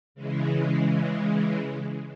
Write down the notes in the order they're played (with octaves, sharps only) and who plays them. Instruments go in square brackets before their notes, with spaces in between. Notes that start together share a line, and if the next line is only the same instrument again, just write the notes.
[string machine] C#3 E3 G#3